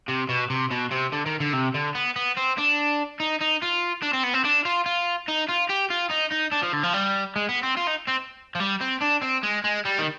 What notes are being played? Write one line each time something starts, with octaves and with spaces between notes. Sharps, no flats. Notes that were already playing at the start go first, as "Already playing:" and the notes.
C3
B2
C3
B2
C3
D3
D#3
D3
C3
D3
B3
B3
C4
D4
D#4
D#4
F4
D4
C4
B3
C4
D4
F4
F4
D#4
F4
G4
F4
D#4
D#4
D4
F3
D3
F3
G3
G#3
B3
C4
F4
D#4
C4
F3
G3
C4
D4
C4
G#3
G#3
G3
D#3